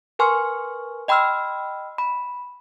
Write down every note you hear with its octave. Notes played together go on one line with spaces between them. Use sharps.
A#4 B4 G#5 C6 C#6 F6
D#5 G5 B5 C6 E6 F6
B5